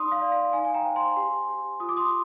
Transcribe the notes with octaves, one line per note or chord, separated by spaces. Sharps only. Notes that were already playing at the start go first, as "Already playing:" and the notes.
Already playing: D#4 D5 C6 D#6
F5
D5
F5
D#4 F5 G#5
G#5
G5 A#5
C5
G#5 C6
G4
G4
F4 D#6
D6
C6 D#6